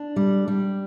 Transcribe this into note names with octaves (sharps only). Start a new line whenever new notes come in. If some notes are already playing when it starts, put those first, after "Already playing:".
Already playing: D4
G3
G3